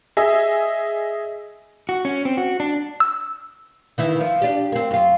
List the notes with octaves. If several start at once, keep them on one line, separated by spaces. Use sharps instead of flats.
G#4 D#5 E5
F#4
C#4
C4
F#4
D4
E6
D#3 E3 E4
F3
D4 G4
A#3 C4
F#2 F4